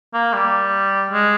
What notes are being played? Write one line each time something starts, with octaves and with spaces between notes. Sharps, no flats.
A#3
G3
G#3